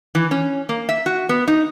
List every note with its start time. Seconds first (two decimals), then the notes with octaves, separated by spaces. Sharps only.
0.15 E3
0.31 C#4
0.69 A#3
0.89 E5
1.06 F#4
1.29 B3
1.48 D#4